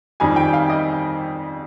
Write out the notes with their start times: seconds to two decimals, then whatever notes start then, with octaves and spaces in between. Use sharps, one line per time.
0.20 F2 D#3 G3 G#5
0.36 G5
0.53 F5
0.70 D#5